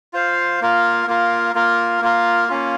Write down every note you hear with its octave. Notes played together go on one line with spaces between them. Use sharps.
F4 C5 F5
A#3 F4 A#4
A#3 F4 A#4
A#3 F4 A#4
A#3 F4 A#4
A#3 C#4 F4